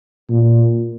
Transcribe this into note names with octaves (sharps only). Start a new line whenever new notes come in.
A#2